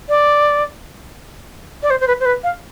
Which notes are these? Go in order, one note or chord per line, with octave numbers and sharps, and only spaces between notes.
D5
D5
C5
C5
B4
C5
B4
F5